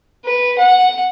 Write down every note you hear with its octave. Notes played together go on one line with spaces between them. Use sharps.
B4
F#5